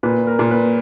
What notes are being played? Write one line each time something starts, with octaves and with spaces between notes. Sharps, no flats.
A#2 B4
A#4
A#2
B4